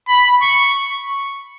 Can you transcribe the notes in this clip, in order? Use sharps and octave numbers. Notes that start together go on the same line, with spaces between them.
B5
C#6